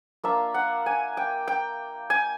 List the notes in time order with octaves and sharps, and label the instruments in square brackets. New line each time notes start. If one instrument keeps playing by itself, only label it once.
[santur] A#3 D4 F4 E5
F#5
G#5
G5
G5
G#5